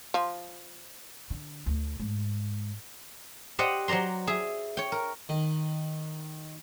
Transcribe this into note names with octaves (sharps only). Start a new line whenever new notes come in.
F3
D3
D2
G#2
G4 C5 D5 D#5 F#5 B5
F#3 C5 D5 A#5 C6
G#4 E5
C#5 G5
A#4
D#3